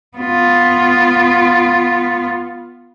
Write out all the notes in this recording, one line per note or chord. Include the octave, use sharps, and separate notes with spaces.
B3 F4